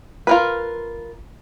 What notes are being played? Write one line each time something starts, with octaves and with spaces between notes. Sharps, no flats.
F4 A#4 B4